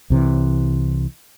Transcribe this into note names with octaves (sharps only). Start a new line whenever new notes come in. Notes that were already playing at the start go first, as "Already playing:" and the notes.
C2 C3 E3